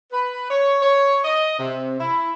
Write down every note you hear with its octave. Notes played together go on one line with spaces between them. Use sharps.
B4
C#5
C#5
D#5
C3
E4